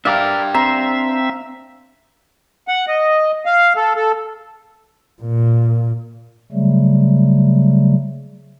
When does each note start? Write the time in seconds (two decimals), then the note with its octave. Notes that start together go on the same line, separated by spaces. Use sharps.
0.05 D4 G4 A#4 D5 E5 F5
0.55 C4 C5 E5 A#5
2.68 F#5
2.88 D#5
3.46 F5
3.76 A4
3.96 A4
5.22 A#2
6.52 C#3 F#3 G3 A3